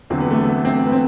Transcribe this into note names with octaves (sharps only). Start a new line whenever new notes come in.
E2 D3 F#3 C4
B3
A3
B3
C4
B3
C4